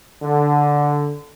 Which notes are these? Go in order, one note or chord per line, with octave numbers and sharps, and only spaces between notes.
D3